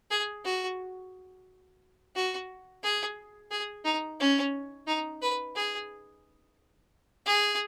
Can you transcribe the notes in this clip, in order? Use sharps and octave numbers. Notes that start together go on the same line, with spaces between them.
G#4
F#4
F#4
G#4
G#4
D#4
C#4
D#4
B4
G#4
G#4